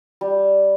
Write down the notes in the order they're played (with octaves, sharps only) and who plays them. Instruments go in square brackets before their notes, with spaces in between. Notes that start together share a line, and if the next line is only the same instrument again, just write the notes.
[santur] G3